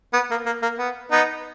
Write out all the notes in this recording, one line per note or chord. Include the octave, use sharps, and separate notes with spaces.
B3
A#3
A#3
A#3
B3
B3 D#4